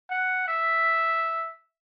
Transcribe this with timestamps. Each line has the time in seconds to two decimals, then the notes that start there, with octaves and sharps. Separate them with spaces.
0.10 F#5
0.48 E5